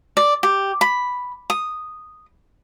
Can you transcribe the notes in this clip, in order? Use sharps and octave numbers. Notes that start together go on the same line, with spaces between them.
D5
G4
B5
D#6